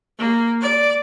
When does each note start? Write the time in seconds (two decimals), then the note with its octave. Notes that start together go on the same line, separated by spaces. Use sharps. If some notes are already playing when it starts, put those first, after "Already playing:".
0.18 A#3
0.61 D5